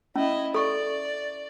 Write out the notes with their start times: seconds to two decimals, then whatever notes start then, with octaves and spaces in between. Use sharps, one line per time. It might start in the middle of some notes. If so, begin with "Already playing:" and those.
0.16 C#4 E4 D#5
0.55 A4 D5 C#6